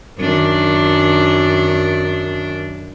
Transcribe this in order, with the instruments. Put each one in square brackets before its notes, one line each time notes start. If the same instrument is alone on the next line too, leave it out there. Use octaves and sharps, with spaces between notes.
[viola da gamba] F#2 D#3 D4